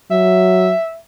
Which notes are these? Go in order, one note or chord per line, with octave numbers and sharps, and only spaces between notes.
F#3 E5